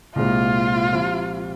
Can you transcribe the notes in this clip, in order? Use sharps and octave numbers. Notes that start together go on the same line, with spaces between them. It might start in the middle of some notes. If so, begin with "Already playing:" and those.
C2 A#2 G#3 C4 F4
C3 F3 C4